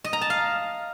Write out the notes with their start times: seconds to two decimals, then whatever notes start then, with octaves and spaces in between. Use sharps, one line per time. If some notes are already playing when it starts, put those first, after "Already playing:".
0.04 D#5
0.13 A#5
0.21 A5
0.30 F5